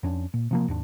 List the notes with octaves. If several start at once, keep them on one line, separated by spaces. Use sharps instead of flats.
F2 C#4 D4
A#2
C3 F3 A#3
D#2 G#2 D4